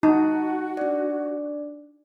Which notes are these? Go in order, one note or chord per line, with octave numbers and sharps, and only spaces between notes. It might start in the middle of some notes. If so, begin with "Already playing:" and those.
D#4 F#4 A5
D4 D5